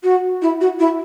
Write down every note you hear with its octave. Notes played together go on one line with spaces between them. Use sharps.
F#4
E4
F#4
E4